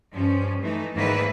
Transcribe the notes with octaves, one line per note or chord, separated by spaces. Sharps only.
G2 F3 C#4
E3 A3 D#4
E2 G#2 D#3 A#3 E4 B4